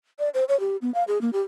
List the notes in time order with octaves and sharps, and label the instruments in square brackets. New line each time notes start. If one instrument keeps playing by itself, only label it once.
[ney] D5
C5
C#5
G4
B3
F5
G#4
A#3
G4